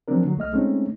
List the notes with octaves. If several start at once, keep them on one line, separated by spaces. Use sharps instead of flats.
F3 F#3 A3 C4 D4 A#4
D3 F#3
C2 A3 D#5 F6
G#3 A3 C4 C#4 D#4